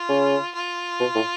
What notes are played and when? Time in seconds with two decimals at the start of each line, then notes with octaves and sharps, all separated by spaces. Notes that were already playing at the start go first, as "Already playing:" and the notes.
Already playing: F4
0.09 C#3
0.55 F4
1.00 B2
1.15 A2